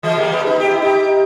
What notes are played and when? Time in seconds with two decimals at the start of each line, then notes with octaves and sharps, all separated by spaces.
0.03 E3 G#3
0.17 G3 A#3
0.32 G#3 B3
0.46 B3 D#4
0.60 G4
0.72 E4
0.82 D#4 G4